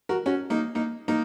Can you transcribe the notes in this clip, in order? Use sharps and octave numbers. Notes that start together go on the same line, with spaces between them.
F#4 A#4
C#4 F#4
A#3 D#4
A#3 D#4
A#3 D#4